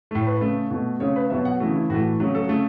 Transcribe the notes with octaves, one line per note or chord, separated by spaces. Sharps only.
A2 A3
B4
C#3 A3
B2 A3
C#3 A3 C#5
B4
B2 F#3 B3 E5
F#5
C#3 E3 A3 F#4
E4
A2 E3 A3 F#4
C#3 F#3 A3
A4
C#3 A3